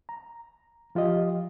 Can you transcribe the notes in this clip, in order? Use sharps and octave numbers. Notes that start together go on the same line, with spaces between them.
A#5
F3 F4 G4 D#5